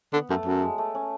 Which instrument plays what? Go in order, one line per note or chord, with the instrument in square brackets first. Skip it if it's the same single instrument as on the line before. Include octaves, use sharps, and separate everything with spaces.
[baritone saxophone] D3 [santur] B3
[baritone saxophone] F#2 [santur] A3
[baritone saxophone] F#2 [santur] F#3
[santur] G#3
A3
C#4